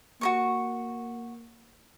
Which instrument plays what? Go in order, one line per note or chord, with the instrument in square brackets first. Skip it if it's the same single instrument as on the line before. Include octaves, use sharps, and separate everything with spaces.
[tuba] A#3 [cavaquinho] F#4 A#4 C#6